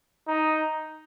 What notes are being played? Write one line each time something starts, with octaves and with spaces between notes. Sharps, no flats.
D#4